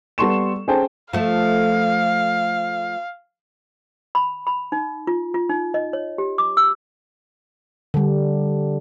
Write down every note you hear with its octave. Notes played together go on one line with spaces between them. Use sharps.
G3 B3 A4 C6 C#6 E7
C#4 G#4 A4 C5 G5 A5
F3 A3 F5
B5
B5
D#4
F4
F4
D#4
D#5
C#5
G4
D6
E6
D3 G3